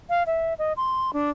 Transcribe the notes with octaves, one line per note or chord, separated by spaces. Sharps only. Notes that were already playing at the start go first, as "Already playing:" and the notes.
F5
E5
D#5
C6
D4